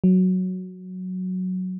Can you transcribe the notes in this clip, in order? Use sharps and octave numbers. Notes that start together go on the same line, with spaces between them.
F#3